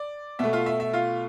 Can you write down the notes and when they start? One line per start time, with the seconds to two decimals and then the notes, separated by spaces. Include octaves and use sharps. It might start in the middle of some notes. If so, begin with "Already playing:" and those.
Already playing: D5
0.39 B2 A3 E5
0.53 F4 F5
0.66 E5
0.80 E5
0.93 F4 F5